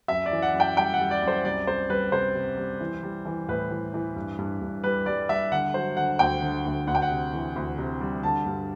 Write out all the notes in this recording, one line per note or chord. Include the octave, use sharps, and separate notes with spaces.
F#2 E5
D5
E3
F#5
F#2
G5
G3 G5
F#5
G3
D5
F#2
C5
C2 D5
C2 C5
G3 B4
C3 C5
C3
G3
E3
G3
E3
A2 B4
E3
E3
G2
G2
G2
G3 B4
G3 D5
G3 E5
D3 F#5
F#3 C5
D3 F#5
D2 G5
D3
D2
D2 F#5
G5
F#5
C3
E3
D2
C3
G3
D3 A5
G2